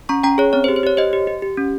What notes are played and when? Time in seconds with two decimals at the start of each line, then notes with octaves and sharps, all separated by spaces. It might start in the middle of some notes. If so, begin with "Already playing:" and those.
0.09 C#4 A#5 C#6
0.23 C#4 G5 A#5
0.38 G#4 C#5
0.53 C4 C#5
0.64 C5
0.68 G4
0.76 C5
0.83 G4 C#5
0.97 G4 C5 D#5
1.13 G4
1.27 G4
1.42 G4
1.57 C#4